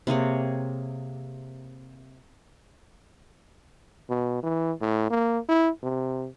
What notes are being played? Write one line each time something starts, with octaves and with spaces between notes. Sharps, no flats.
C3 A#3 G#4 C#5
B2
E3
A2
A#3
E4
C3